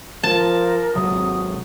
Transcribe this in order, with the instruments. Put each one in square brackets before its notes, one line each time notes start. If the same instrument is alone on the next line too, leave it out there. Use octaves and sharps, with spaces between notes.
[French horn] F3 [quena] A#4 [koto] A5
[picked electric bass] G#1 C3 F#3 [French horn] F#4 [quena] D#6